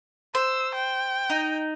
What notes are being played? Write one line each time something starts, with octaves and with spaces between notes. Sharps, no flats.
C5 E6
G5
D#4